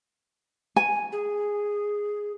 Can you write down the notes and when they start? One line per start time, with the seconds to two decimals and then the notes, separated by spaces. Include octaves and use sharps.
0.76 G#5
1.12 G#4